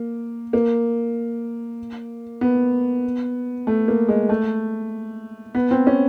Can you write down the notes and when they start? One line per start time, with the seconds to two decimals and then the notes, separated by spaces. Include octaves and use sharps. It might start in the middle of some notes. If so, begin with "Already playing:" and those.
Already playing: A#3
0.53 A#3
2.41 B3
3.67 A3
3.88 A#3
4.08 G#3
4.29 A3
5.55 B3
5.71 C4
5.87 C#4